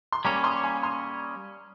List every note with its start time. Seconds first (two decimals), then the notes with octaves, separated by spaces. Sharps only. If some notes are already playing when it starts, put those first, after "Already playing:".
0.13 C6
0.25 G3 A#3 C#4 A#5 C#6
0.44 C6 D#6
0.64 G#5 C6
0.83 C6 D#6